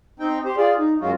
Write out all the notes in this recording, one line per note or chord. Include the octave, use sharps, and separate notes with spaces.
C4 D#4 G5
G4 C5
F4 G#4 D5
D#4
F#2 F#3 G#3 C#4 F4 F#4